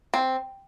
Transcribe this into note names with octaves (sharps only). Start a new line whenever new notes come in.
C4